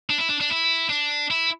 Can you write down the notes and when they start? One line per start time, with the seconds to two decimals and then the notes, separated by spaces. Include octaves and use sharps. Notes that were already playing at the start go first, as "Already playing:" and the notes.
0.10 D4
0.18 E4
0.29 D4
0.41 D4
0.50 E4
0.89 D4
1.31 E4